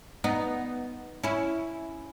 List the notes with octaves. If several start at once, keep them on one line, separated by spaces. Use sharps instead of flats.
B3 D#4
C#4 E4